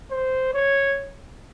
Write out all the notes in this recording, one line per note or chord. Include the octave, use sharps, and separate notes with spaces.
C5
C#5